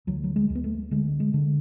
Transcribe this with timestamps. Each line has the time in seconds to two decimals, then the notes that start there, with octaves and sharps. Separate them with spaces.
0.07 D2 F#3
0.24 F#3
0.36 G#3
0.50 D2
0.55 B3
0.64 A3
0.91 D3 G#3
1.20 G#3
1.34 D3